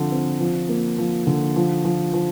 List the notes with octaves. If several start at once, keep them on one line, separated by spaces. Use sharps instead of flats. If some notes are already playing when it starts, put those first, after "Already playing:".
Already playing: D3 F3 C4
C4
F3
A#3
F3
D3
F3
F3
F3